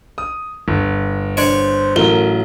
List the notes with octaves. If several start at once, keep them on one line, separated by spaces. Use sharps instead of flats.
D#6
G1
D4 C5 C#5
A1 F#3 A#4 G7